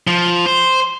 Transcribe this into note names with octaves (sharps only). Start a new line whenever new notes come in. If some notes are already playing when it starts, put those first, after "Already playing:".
F3
C5